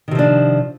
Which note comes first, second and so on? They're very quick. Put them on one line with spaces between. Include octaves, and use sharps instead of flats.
D#3 C3 F3 D4